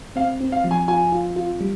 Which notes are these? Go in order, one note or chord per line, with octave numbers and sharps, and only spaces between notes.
C4 F5
C4
F5
F3
G#5
F4 G#5
F4
F4
G3